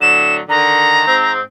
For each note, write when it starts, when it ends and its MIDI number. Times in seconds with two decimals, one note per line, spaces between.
0.02 0.39 45
0.02 0.39 50
0.02 0.39 54
0.02 0.35 100
0.49 1.03 50
0.49 1.03 51
0.49 1.33 82
1.07 1.41 44
1.07 1.41 60